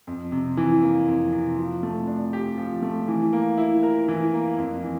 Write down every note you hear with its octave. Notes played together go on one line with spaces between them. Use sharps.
F2
C3
E3
A#3
F2
C3
F3
A3
D4
G4
F3
A3
E3
A#3
E4
A#4
E3
A#3
F2
E3